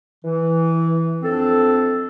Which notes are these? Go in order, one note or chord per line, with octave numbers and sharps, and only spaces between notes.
E3
F2 C4 D4 A4